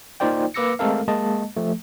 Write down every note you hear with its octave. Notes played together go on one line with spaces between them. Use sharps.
A#3 D#4 F4 C5 D5 G5
A#3 B4 D6 E6 A#6 C#7
G#3 A3 C4 A4 A#4 F5
G#3 A#3 D#5 A5
F3 A3